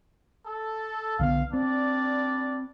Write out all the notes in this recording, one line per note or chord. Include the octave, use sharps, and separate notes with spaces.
A4
B1 D3 B3 F5
G3 C4 D4 D5